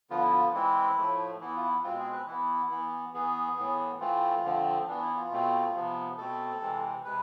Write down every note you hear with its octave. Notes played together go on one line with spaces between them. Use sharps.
D3 F3 B3 F4
E4
F4
E3 G#3 C4 E4
A2 F3 A3
E3 B3 E4
F4
E4
B2 G#3 C4 F4
G#4
B4
E3 B3 E4
E3 B3
E3 B3 G#4
A2 E3 B3
E3 A3 C4 F4
D3 F3 A3 C4
E3 B3 D4
E4
F4
B2 A3 C4
C3 F3 B3
B2 A3 C4 A4
C3 E3 G#3 C4
C3 G#3 B4